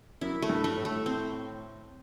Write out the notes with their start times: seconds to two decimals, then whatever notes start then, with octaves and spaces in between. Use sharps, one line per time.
0.21 F#2 E4
0.42 A3
0.50 G2
0.64 A3
0.77 A2
0.85 A3
1.06 C4